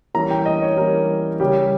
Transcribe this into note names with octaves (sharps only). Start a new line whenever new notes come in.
E3 G3 A#3 C#4 A#5
G5
D#5
C#5
E3 G3 A#3 C#4 A#4
C#3 G3 C#4 G4